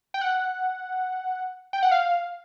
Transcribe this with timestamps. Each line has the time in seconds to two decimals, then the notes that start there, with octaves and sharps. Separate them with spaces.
0.14 G5
0.21 F#5
1.73 G5
1.83 F#5
1.91 F5